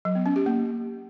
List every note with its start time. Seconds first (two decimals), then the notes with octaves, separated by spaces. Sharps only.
0.05 F#3
0.15 B3
0.26 C#4
0.36 G4
0.46 A#3